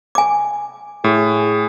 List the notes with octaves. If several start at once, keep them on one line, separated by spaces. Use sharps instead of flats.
G#5 D6
A2 G#4